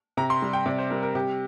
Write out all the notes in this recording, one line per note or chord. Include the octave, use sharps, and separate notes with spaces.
C3 A#5
C6
G3
G5
C3 D5
C5
G3 A#4
A#4
C3 G4